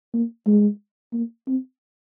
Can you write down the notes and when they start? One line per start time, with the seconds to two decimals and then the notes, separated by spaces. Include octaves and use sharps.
0.14 A#3
0.47 G#3
1.13 A#3
1.47 C4